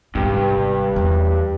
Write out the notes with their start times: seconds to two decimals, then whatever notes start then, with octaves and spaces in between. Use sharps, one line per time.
0.15 G#1 G2 C3
0.96 E2